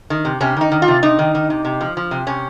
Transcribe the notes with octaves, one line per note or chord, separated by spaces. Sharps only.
D#3
C3
C3 C#4
D#3 D#4
D#3
F4
C3
C3 D#4
D#3
D#3
C3
C3
F3
F3
C3
C3 C#4